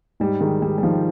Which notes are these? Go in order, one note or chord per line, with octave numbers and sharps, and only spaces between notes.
G#2 G3
D#3 G#3
G#2 G3
G3
D#3 F3